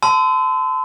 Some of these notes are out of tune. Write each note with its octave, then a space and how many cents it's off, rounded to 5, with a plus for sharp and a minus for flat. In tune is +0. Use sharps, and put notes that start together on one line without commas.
A5 +0 C6 -40 E6 -15